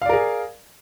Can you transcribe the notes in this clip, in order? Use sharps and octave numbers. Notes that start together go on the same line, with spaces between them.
G#4 A#4 D5 F5